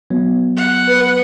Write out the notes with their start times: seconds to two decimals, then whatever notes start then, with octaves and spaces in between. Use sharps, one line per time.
0.10 F#3 B3
0.56 F#5
0.89 B4